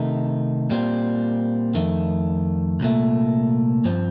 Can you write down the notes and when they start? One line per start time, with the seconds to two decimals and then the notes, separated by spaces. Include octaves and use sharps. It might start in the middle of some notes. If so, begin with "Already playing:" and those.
Already playing: C3 D#3 A3 D#4
0.70 A#2 G3 C4
1.74 F2 D#3 A3
2.80 C2 A#2 A3
3.84 G2 F3 C4